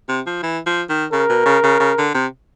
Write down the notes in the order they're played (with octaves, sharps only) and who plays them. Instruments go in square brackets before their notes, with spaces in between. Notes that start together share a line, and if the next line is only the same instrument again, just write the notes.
[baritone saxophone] C3
F3
E3
F3
D#3
[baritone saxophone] C#3 [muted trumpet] A#4
[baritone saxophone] B2
C#3
C#3
C#3
D3
C3